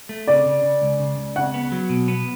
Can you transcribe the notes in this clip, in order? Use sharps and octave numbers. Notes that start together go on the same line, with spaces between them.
A3
C#3 D5
C#3
C#3
C#2
C#3
C#2
C#3 F#5
B3
F#3
B2
B3